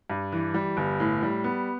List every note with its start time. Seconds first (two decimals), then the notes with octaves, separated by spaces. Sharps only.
0.10 G2
0.32 E3
0.54 G3
0.77 G1
1.00 A2
1.23 G3
1.44 B3